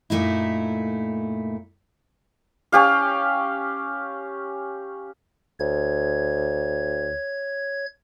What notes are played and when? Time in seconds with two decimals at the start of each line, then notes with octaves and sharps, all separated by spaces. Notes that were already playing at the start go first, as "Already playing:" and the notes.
0.10 F#2 A#2 A3 D#4 E4
2.72 C#4 G4 F5
5.60 D2 C#5 G#6